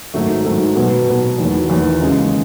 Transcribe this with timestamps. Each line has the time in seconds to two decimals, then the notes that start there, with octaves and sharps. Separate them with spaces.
0.14 G#2 D#3 F#3 A3
0.44 G#2 D#3 F#3 A3
0.76 B2 F#3 B3
1.07 B2 F#3 B3
1.39 E2 D#3 F#3
1.69 E2 D#3 F#3
2.01 D#2 C#3 G#3 C#4